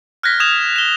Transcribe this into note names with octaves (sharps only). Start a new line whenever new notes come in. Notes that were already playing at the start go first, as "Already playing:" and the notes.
F6 F#6 G#6 A#6 B6
D#6 G#6 E7 F7
E7 G7